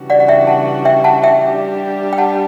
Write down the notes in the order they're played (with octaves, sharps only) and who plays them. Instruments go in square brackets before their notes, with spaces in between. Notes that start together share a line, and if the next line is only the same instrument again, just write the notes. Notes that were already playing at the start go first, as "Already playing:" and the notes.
Already playing: [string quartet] C#3 E3 G3 D4 F#4
[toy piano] D5 F#5
F#5
E5 G5
F#5 A5
E5 G5
F#5 A5
E5 G5
[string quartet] G3 D4 G4
[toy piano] G5
F#5 A5